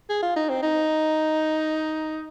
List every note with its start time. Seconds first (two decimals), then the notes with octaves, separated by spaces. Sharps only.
0.09 G#4
0.23 F4
0.36 D#4
0.49 C4
0.63 D#4